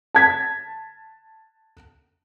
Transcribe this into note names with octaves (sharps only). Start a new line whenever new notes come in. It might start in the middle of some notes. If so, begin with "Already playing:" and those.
A5 G#6 B6